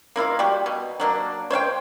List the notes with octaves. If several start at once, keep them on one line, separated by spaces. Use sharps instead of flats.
A#3 E4 F4 F5
G3 F#4 G4
B2
F#3 A#3 D4
C5 C#5 F5 G5